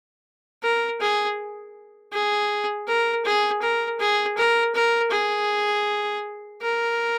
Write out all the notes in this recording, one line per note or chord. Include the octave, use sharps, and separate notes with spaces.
A#4
G#4
G#4
A#4
G#4
A#4
G#4
A#4
A#4
G#4
A#4